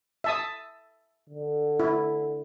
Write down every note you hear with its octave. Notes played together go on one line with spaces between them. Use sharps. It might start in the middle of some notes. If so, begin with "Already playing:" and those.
E5 A5 D#6
D3
E4